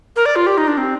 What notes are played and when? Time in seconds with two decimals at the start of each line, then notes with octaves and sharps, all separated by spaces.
0.16 A#4
0.26 D5
0.36 F4
0.47 G4
0.58 D#4
0.68 D4
0.78 C4